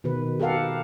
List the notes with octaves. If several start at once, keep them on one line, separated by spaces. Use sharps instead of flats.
B2 D#3 B4
G4 A4 A#4 F5 F#5